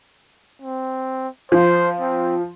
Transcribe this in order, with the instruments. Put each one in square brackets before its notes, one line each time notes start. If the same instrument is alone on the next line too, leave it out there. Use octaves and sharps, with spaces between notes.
[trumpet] C4
[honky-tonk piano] F3 [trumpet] C5
[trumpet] C4